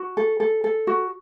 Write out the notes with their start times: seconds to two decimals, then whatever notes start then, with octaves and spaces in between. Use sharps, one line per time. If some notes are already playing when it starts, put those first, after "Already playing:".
Already playing: F#4
0.17 A4
0.40 A4
0.64 A4
0.87 F#4